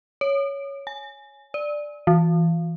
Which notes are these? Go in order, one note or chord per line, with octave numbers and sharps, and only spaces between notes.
C#5
G#5
D5
E3